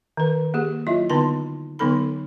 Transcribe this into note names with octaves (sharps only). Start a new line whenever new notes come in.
D#3 B4
A#3 G4 G#4
F#3 E4 F4 D#5 E5
D3 B3 D#4 A5 C6
D3 F#3 B3 D#4 A4 B5